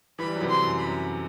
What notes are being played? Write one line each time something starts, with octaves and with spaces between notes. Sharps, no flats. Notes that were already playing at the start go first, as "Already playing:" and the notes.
E3 G3 B5
F#3
C3 E3
C6
F#2
B5
F#2